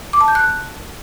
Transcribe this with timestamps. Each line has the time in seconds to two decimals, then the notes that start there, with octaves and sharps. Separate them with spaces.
0.13 D6
0.21 A5
0.28 G6
0.35 F#6